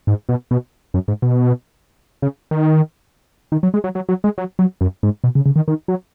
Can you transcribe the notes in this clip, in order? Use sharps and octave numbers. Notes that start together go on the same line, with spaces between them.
G#2
B2
B2
F#2
G#2
B2
C#3
D#3
D#3
F#3
G#3
F#3
F#3
F#3
G#3
F#3
F#3
F#2
G#2
B2
C#3
C#3
D#3
D#3
F#3